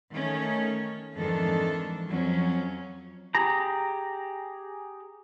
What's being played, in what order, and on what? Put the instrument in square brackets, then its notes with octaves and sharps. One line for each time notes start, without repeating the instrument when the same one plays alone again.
[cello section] D#3 A3 C#4
F2 G#2 D#3 E3 D4 A4
F2 F#3 C#4
[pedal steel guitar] G4 G#4 A#5